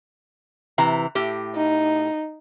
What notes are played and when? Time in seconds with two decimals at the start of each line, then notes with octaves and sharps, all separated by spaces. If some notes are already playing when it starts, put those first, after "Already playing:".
0.78 C3 E3 A#5
1.15 A2 G4
1.56 D#4